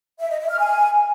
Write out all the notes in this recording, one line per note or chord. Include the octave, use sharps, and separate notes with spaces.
E5
D#5
E5
F6
G#5